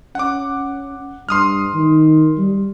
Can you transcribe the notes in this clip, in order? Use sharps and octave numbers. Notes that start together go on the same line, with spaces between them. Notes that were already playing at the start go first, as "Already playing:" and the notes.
C#4 F#5 D6
G2 C6 D#6 F6
D#3
G3